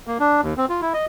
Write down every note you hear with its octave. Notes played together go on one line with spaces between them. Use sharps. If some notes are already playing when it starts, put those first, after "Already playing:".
A#3
D4
D#2
C4
F4
E4
D#5